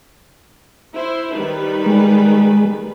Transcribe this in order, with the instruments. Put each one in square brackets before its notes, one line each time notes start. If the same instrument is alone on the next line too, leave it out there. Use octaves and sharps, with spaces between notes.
[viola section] E4 C5
D#3 G3 B4
[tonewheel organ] G#3